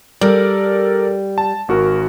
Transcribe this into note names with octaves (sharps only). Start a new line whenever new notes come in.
G3 A4 A#4 D5
A5
G#1 F#4 A#4